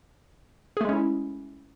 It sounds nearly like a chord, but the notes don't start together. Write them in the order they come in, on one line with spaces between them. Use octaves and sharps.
G#4 A3 G#3 C#4 E4